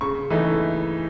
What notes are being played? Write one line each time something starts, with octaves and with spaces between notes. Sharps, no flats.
C#3 C#6
E3 A3 D#4